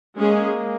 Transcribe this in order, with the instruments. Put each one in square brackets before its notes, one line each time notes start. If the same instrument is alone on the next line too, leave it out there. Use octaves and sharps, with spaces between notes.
[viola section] G#3 C#4 G#4 [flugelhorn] A#3